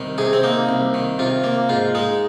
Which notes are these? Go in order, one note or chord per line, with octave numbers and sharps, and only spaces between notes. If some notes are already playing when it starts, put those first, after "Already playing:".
Already playing: C2 D#3
C3 G#4
C4
A#3 D#4
C2
D#3
C3 F4
A#3
G#2 F4
G#3 D#4